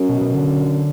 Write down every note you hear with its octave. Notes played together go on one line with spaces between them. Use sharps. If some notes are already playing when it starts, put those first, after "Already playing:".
Already playing: F#2
B2
B2
D3